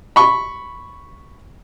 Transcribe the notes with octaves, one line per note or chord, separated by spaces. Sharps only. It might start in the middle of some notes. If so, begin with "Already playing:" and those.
B5 C#6